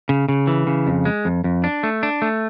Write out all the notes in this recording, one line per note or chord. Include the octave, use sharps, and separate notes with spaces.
C#3
C#3
E3
C#3
F2
G#3
F2
F2
D4
A3
D4
A3